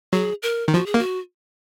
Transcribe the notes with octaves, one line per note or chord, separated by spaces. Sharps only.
F#3 G#4
A#4
D#3
F3 F#4
G#4
A#3
F#4